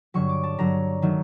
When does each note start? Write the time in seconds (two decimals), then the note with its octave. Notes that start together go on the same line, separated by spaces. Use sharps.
0.14 G2 D3 F#3 C#6
0.29 D6
0.44 A5
0.58 G2 D3 F#3 A#5
1.02 D#3 F#3 A3